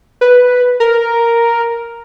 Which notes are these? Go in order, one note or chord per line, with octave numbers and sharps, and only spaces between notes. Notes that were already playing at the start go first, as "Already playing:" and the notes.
B4
A#4